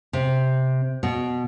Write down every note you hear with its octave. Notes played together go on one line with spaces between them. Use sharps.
C3
B2